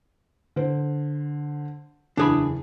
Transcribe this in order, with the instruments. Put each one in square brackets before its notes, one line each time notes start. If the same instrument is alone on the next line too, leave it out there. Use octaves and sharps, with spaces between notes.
[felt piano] D3 C5
[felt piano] F#1 E2 [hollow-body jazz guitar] D4 G#4 B5